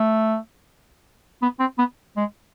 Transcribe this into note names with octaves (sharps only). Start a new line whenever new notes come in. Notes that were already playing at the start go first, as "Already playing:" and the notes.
Already playing: A3
B3
C4
B3
G#3